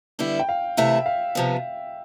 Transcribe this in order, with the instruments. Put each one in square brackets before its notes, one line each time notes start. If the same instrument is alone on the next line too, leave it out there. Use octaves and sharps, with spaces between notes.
[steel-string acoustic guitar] D3 G3 B3 E4
[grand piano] G5
F5
[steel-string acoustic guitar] C3 E3 A3 E4 [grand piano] E5
[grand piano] F5
[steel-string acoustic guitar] C3 F3 B3